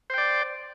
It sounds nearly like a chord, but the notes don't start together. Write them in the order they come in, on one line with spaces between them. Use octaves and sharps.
C5 G5 D5